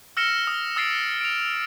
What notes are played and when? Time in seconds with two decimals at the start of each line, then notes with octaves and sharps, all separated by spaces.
0.17 E6 F6 A#6 C#7 E7 G7
0.47 D#6
0.76 D#6 E6 A6 C7 D7 E7
1.21 D7 F7